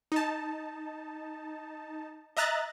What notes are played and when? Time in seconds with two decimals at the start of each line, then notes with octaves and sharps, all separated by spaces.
0.12 D#4 A5
2.37 D#5 E5 A#5 F#6 A6